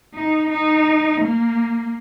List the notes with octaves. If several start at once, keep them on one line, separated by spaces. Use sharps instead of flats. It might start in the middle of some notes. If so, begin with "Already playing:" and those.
D#4
D#4
A#3